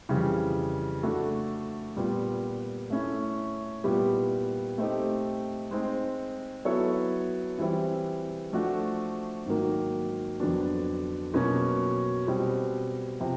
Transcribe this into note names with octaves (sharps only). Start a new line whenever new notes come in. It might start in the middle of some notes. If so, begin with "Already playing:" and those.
F2 C#3 E3 G3
A3 D4 F#4 A4
A#2 G3 B3
A3 C#4 E4
A#2 G3 B3 E4 G4
A3 C4 D#4 G4
G#3 C4 D#4
F#3 B3 E4 A4 C#5
E3 G3 C4 E4
F3 A3 D4 F#4
G#2 D#3 F#3 A#3
F2 D3 F#3 B3 D4
B2 F#3 A#3 C#4
B2 G3 C4
C3 F3